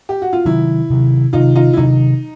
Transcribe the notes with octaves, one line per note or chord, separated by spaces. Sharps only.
G4
F#4
F4
C3 D#3 F#3 E4
C3 D#3 F#3
C3 D#3 F#3 D#4 F4
D#4 F4
E4
C3 D#3 F#3 D#4